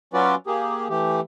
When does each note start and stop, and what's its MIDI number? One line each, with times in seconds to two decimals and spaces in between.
0.13 0.35 54
0.13 0.35 61
0.13 0.35 65
0.13 0.35 66
0.13 0.35 71
0.13 0.35 74
0.47 0.88 58
0.47 0.88 67
0.47 0.88 68
0.89 1.20 52
0.89 1.20 57
0.89 1.20 67